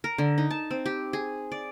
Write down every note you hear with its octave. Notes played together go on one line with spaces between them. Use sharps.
A#4
D3
D#4
A5
C4
G4
G#4
D5